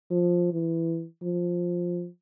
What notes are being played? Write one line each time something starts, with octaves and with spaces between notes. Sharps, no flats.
F3
E3
F3